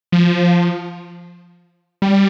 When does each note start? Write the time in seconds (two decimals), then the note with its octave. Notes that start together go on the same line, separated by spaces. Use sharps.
0.12 F3
2.02 G3